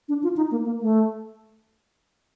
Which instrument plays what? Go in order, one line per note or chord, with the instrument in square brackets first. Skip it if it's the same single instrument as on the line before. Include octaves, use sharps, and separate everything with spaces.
[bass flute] D4
F4
D#4
A#3
A#3
A3